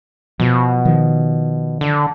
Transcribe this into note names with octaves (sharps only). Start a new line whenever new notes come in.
B2 F3
D#3 F3
D3